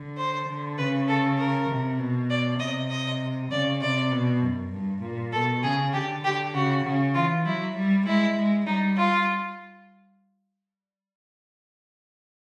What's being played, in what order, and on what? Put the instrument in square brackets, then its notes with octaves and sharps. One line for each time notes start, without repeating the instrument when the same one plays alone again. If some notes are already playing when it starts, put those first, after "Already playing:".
Already playing: [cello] D3
[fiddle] C5
[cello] D3
[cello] C#3 [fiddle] B4
[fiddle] A4
A#4
[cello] C3
B2
[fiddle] D5
[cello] C3 [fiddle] D#5
[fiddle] D#5
[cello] C#3 [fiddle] D5
[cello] C3 [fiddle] D5
[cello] B2
F#2
G2
A#2
[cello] B2 [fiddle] A4
[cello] C#3 [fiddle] G#4
[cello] D3 [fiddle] G4
[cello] D3 [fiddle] G4
[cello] C#3 [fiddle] F#4
[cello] C#3
[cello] E3 [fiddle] F4
[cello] F#3 [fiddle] E4
[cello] G3
[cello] G#3 [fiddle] E4
[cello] G#3
[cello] G3 [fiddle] D#4
[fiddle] F4